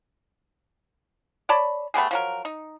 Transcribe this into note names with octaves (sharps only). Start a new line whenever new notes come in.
C#5 D5 A5 B5
A3 B3 G4 G#4
F3 F#3 A#4
D#4